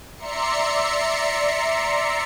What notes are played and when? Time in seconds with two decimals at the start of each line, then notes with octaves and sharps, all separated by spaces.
0.17 D5 E5 A#5 C6 C#7